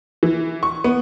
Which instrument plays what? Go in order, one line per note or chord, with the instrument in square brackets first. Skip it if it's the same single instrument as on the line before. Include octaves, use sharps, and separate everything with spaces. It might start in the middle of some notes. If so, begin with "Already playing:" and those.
[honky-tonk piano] E3
C#6
B3